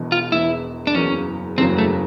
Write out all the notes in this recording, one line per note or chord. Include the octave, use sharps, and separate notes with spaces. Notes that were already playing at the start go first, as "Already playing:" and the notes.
Already playing: E1 E2 B2
F4
E1 E2 B2 E4
D4
F#1 E2 C#3 F#3 A#3 C#4
F#1 E2 C#3 F#3 A#3 C4
A3